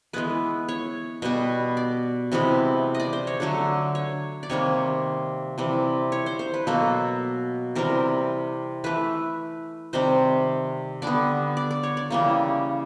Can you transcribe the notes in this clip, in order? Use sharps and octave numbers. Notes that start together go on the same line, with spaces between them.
E3 G#3 B3 B4
C#5
B2 G3 B3
D5
C3 E3 G#3 B3
D#5
D5
C5
C#5
D3 F#3 A3
C#5
D5
C3 D#3 G3 A#3 C#5
C3 E3 G3
C#5
C5
C5
B4
B2 F#3 A#3 A4
C3 E3 G3 A#4
E3 A3 B4
C3 D#3 G3 C5
D3 G3 B3 D5
D5
D5
C#5
D5
C#3 E3 G3 A#3